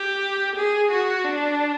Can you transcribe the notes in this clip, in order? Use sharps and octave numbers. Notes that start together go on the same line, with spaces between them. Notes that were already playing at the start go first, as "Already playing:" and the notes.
Already playing: G4
G#4
F#4
D4